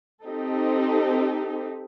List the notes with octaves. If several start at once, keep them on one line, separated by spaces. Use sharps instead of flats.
C4 D#4 G4 A4